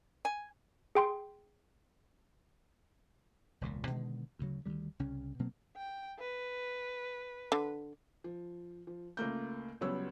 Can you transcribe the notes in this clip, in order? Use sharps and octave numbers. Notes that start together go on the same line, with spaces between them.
G#5
G#4 G5 C6
E1 C#2 A#2
B2 D3 D#3 G#3
D2 C#3 F#3
D2 D#3 F#3 G3
C2 C#3 C#4
B2 F#3 A#3 C4
G5
B4
D3
F3
F3
C#2 A3 A#3 G6
C#2 F#3 G3 B3 C#5 E6